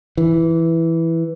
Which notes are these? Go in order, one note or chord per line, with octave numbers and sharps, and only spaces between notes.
E3